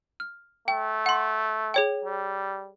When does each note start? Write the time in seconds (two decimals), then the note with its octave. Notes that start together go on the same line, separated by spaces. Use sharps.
0.20 F6
0.68 A3 G5
1.06 F#5 C6
1.74 G#4 C#5 G5
2.04 G3